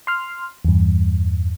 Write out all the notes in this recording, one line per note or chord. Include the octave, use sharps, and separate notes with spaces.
C6 F6
E2 G2